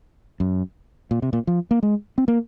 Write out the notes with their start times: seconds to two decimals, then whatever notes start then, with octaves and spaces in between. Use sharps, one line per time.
0.40 F#2
1.11 A#2
1.22 C3
1.33 A#2
1.47 F3
1.71 A#3
1.83 G#3
2.18 C4
2.28 A#3